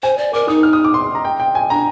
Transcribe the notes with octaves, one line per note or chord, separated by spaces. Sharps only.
C5 G#5
D5
A#4 D6
D#4 D#6
F6
D#6
D6
C6
C6
A#5
G5
G5
G#5
D4 A#5